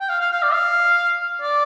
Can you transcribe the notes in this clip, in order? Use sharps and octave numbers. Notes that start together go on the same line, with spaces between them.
G5
F5
F5
F5
D5
F5
D5